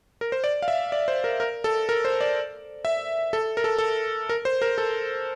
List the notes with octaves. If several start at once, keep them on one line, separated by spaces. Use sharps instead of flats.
A#4
C5
D5
F5
E5
D5
C5
A#4
A#4
A4
A#4
C5
D5
E5
A4
A#4
A4
A4
A#4
C5
A#4
A4